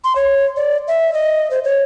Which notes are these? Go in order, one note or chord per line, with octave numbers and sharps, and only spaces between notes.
C6
C#5
D5
E5
D#5
C5
C#5